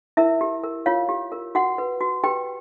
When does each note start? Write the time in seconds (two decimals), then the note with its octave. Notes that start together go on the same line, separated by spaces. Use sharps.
0.17 E4 A#4 E5
0.41 G4
0.64 A#4
0.86 F4 C#5 F5
1.09 G4
1.32 A#4
1.55 F#4 F#5
1.78 B4
2.01 F#4
2.24 G4 B4 G5